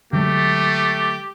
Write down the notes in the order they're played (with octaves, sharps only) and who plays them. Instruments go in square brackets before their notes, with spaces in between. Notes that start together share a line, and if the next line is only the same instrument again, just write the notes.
[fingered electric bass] D3 F#3 G#3 [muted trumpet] A3 [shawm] G4